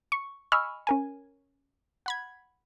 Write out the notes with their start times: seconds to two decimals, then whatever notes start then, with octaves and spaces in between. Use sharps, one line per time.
0.12 C#6
0.52 D#5 G#5 B5 C#6 E6 F6
0.87 C#4 A#4 G#5
2.06 F#5 B5 G#6